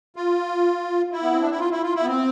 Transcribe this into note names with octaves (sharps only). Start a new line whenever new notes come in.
F4
E4
B3
C4
D4
E4
F4
E4
F4
E4
B3
C4